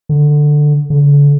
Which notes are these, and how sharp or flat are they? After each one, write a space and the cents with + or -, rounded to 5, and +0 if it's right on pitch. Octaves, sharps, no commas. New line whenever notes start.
D3 +10
D3 -40